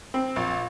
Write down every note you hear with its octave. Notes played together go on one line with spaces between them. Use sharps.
C4
A#1